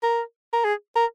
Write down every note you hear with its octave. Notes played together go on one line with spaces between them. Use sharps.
A#4
A#4
G#4
A#4